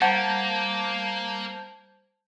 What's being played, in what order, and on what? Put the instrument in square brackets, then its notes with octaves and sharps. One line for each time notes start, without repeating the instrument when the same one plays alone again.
[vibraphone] G3 C5 A#5 [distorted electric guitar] A#3 [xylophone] F#5 [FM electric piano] A5 G6 G#6